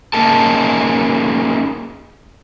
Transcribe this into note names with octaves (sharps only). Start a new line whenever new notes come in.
A#3 C#4 D#4 G#4 A#4 A5